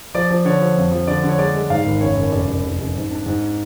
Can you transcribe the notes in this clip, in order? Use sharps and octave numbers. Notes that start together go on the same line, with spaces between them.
F3 D5
F3
D3 C#5
F3
F2
F3
D3 D5
D3
C#5
G#3 D5
G#3
G#2 F5
G#1
F#1 C#5
F#1
F1 D5
F1
F1
F1
G#2
D4
G#2